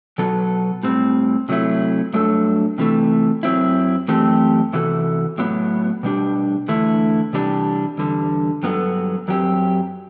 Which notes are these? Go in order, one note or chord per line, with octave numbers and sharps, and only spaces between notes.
B2 F#3 B3 F#4 A4
A2 G3 C4
C3 F#3 A3 E4
G2 F#3 A3 D4 A4
C3 E3 A3
F#2 F#3 C4 E4
F#2 E3 A3 C4 G4
C3 E3 B3 F#4 A4
A2 F#3 B3
B2 G3 D4 G4
E2 D3 A3 E4
C3 E3 G3 D4 G4
E2 D3 G3
G2 F#3 B3 F#4 A4
F#2 F#3 C4 G4